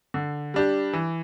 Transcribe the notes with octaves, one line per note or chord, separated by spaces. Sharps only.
D3
G3 D4 G4
E3